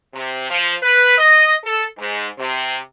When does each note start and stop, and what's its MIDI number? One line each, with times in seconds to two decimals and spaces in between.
0.14 0.49 48
0.50 0.73 53
0.82 1.15 71
1.18 1.52 75
1.64 1.84 69
1.98 2.27 44
2.38 2.79 48